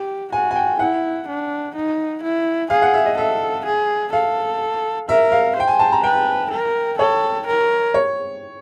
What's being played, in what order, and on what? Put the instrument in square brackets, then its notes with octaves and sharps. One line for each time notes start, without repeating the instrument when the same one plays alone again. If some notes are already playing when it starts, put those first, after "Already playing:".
Already playing: [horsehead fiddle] G4
[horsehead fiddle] F#4 [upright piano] G#5
[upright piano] G#5
G5
[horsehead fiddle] E4 [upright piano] F#5
[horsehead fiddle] D4
D#4
E4
[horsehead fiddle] G#4 [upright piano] F5
[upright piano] F#5
E5
D#5
[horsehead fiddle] A4 [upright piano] E5
[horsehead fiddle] G#4
[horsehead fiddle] A4 [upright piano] F5
[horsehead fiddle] A#4 [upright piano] E5
[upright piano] F5
[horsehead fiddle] C5 [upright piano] G5
[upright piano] G#5
A5
A#5
[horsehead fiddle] B4 [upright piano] G5
[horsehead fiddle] A#4
[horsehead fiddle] A4 [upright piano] C#5
[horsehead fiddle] A#4
[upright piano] C#5